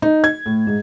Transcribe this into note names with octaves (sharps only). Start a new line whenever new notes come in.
D#4
G#6
A2
G#2